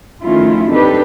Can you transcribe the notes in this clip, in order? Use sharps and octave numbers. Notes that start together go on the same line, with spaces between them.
D#3 F3 A3 C#4 E4 F4
C4 D4 D#4 G4 A4 B4